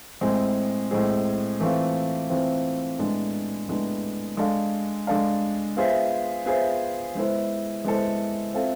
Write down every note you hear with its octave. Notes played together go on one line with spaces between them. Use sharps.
A2 G#3 C4 G#4
A2 G#3 C4 G#4
E3 A3 C4 F4
E3 A3 C4 F4
A2 G#3 B3 D4
A2 G#3 B3 D4
G#3 D4 A4 D5 F5
G#3 D4 A4 D5 F5
B3 F4 G#4 C5 E5
B3 F4 G#4 C5 E5
G#3 B3 E4 A4 C5
G#3 B3 E4 A4 C5
C4 F4 A4 E5